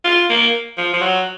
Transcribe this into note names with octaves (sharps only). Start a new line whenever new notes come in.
F4
A#3
F3
F3
F#3